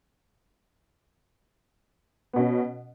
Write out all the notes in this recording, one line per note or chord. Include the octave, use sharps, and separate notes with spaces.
B2 B3 C#4